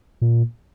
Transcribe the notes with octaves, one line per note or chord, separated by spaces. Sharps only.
A#2